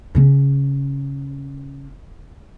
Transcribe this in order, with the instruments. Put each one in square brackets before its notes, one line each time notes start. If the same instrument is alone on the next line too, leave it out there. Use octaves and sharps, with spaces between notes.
[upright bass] C#3 C#4